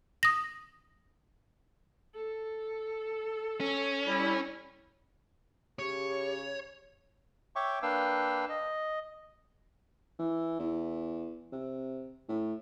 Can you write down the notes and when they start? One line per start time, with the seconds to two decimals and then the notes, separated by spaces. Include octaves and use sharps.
0.23 D#6 A#6
2.15 A4
3.60 C#4
4.07 G3 E4
5.79 C#3 G4 C#5
7.56 C#5 E5 G5 C#6 D6
7.82 A#3 D4 B4 F5 G5 E6
8.49 D#5
10.19 E3
10.59 E2
11.52 C3
12.29 A2